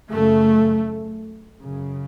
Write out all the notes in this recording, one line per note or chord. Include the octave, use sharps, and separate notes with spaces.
F#2 C#3 A3
F#2 C#3